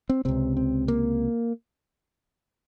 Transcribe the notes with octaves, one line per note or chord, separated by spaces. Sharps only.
C4
C#2 C3 C4
C4
A#3